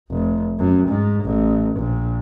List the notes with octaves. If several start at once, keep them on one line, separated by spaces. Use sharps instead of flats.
F1
F#2
G#2
A1
A#1